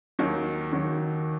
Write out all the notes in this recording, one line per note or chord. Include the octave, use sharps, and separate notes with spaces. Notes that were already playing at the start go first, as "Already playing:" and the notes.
D#2 D#3 F#3
D#2 D#3 F#3